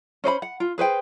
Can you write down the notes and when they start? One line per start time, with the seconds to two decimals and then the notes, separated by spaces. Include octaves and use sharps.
0.24 C#4 C5 D#5 B5
0.42 F#5
0.60 F4
0.78 G#4 B4 C5 G5